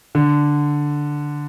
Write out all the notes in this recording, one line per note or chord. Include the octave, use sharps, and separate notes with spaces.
D3